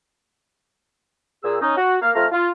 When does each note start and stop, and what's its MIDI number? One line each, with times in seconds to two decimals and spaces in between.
1.43 1.56 46
1.43 1.56 68
1.43 1.56 88
1.61 1.76 61
1.61 1.76 63
1.77 1.96 66
2.01 2.10 58
2.01 2.10 77
2.15 2.25 41
2.15 2.25 57
2.15 2.25 65
2.15 2.25 77
2.15 2.25 82
2.15 2.25 89
2.32 2.49 65